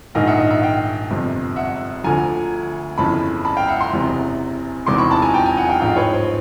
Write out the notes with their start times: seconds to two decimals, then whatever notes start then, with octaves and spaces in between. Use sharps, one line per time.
0.15 A#1 G#2 D#3 D#5 F5
0.27 E5 F#5
0.38 D#5 F5
0.51 E5 F#5
0.62 F5 G5
1.10 G1 F2 C3
1.56 E5 F#5
2.04 D2 D3 F3 G#5 A#5
2.98 G1 F2 C#3 E3 A5 B5
3.45 A5 B5
3.57 F5 G5
3.68 E5 F#5
3.80 A#5 C6
3.93 F#1 E2 C3
4.86 E1 E2 C3 D#3 C6 D6
4.98 B5 C#6
5.10 A5 B5
5.22 G#5 A#5
5.34 G5 A5
5.46 G#5 A#5
5.57 F#5 G#5
5.69 F5 G5
5.81 A1 G#2 F3 F5 G5
5.96 B4 C#5
6.13 C5